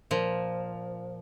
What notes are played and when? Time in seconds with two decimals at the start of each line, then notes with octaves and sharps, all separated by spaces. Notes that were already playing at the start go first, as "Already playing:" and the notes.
0.11 A#2 F3